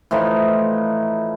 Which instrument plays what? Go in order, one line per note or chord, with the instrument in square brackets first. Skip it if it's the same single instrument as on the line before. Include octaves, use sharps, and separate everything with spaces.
[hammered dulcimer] A2 E3 F3 D#4